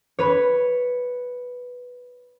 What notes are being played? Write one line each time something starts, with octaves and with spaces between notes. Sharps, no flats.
B4 C#5